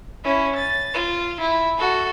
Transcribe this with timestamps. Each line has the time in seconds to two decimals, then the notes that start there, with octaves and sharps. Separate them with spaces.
0.24 C#4 E4
0.55 A6
0.93 F4
1.40 E4
1.78 F#4 A4